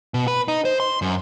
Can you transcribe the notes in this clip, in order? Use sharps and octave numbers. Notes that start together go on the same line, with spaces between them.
B2
B4
D#4
C5
C6
F#2